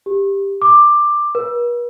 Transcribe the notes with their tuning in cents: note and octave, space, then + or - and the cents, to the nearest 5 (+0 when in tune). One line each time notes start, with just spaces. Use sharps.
G4 +10
D6 +10
B4 -45